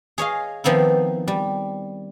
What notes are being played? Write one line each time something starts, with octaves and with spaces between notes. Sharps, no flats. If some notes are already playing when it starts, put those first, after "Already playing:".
G#4 C#5 D#5 F5
D#3 F3 B3 C4 E4
G3